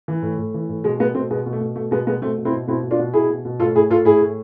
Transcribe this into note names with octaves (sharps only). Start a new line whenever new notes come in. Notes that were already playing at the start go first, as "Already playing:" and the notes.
E3
A2
A2
E3
A2
B2 G#3
B2 G#3 B3
B2 A3 C4
B2 G#3 B3
B2
A3
B2
B2 A3
B2 G#3 B3
B2 G#3 B3
B2 A3 C4
B2
C4 E4
B2
B2 C4 E4
B2
D4 F4
B2
B2 E4 G#4
B2
B2
A2 F4 A4
A2 E4 G#4
A2 F4 A4
A2 E4 G#4
A2